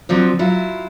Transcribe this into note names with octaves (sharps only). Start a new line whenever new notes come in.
D3 F3 F#3 C4
F#3 E4 F4